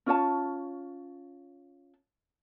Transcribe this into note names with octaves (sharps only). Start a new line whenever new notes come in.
C#4 F4 C#5 A5